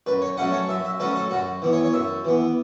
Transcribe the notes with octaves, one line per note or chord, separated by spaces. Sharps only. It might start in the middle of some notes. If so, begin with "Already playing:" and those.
F#2 B4
C#5
F#3 A3 C#4 F#5
C#5
F#2 E5
E5
F#3 A3 C#4 B4
A4
F#2 F#4
E3 B3
C#5
C#5
F#2 E5
E3 B3